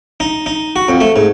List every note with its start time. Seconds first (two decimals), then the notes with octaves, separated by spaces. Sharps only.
0.20 D#4
0.46 D#4
0.76 F#4
0.88 F2
1.01 A3
1.16 G#2